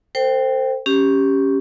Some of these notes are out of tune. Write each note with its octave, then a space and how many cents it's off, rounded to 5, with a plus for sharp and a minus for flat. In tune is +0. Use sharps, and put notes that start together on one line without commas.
A4 +45 C5 +0 G5 +0
C#4 +0 G4 +0